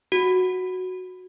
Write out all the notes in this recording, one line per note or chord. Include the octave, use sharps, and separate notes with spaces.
F#4